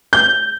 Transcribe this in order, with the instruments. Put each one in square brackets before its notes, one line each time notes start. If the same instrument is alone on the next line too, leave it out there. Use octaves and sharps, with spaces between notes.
[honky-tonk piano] G6